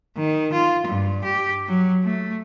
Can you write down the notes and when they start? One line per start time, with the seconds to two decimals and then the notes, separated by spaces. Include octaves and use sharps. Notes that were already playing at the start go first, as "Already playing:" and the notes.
0.17 D#3
0.53 F4
0.87 G2
1.24 G4
1.68 F#3
2.04 A3